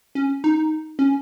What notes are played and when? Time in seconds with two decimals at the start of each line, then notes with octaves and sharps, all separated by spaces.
0.15 C#4
0.44 D#4
0.99 C#4